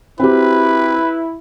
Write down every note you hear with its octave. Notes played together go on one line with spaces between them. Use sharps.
C4 E4 F#4 G4 B4